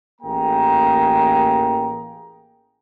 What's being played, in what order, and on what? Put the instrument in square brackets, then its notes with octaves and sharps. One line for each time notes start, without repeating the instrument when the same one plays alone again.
[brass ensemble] A1 A#3 G#4 G5 A#5